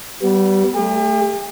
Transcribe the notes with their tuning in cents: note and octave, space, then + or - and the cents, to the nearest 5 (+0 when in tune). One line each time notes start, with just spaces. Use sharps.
G3 -25 B3 +0
A3 +0 G4 +45